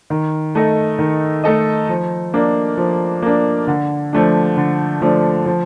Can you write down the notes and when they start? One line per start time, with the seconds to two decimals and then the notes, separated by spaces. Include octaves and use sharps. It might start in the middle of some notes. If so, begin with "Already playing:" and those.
0.10 D#3
0.55 A3 D#4 A4 D#5
0.99 D#3
1.44 A3 D#4 A4 D#5
1.89 F3
2.34 A#3 D4
2.78 F3
3.22 A#3 D4
3.67 D3
4.13 F3 A3 D4
4.57 D3
5.02 F3 A3 D4
5.46 F3